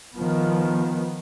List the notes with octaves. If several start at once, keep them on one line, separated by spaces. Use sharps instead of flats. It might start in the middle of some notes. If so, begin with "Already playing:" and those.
D#3 F3 B3